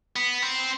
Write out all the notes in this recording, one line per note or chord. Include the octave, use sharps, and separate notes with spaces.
B3
C4